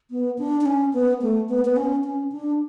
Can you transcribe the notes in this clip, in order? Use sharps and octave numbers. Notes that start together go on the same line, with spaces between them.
B3
D4
D4
C#4
B3
A3
B3
B3
C#4
C#4
D4